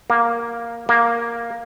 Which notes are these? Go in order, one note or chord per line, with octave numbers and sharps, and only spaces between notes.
A#3
A#3